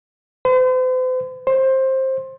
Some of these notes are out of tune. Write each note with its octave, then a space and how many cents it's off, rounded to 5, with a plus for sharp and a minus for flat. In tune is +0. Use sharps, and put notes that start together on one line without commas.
C5 -45
C5 +15